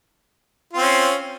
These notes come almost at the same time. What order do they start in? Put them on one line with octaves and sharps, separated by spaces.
F4 C4 C#4